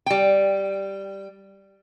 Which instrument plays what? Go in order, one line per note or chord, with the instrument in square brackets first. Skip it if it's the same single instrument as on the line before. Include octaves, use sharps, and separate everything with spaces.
[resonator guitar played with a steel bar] G3 G5